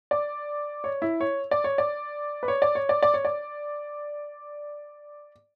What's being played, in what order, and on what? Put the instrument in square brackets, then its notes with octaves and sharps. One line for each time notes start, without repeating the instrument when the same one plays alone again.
[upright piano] D5
C#5
E4
C#5
D5
C#5
D5
B4
C#5
D5
C#5
D5
D5
C#5
D5